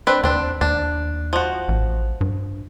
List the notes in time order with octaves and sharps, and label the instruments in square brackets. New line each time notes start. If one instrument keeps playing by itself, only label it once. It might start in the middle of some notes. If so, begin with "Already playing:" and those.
[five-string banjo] C4 D4 B4
[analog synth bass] D#2 [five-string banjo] C4 D4
[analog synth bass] D#2 [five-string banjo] D4
[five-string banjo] F3 F#4
[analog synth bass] A1
G2